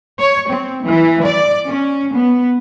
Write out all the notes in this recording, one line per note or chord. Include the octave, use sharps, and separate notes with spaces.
C#5
C4
E3
D5
C#4
B3